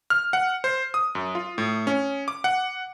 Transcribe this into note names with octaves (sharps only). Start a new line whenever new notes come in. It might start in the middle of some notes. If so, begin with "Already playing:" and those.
F6
F#5
C5
D#6
F#2
F4
A2
C#4
D6
F#5